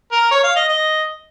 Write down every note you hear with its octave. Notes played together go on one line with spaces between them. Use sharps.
A#4
C#5
F5
D#5
D#5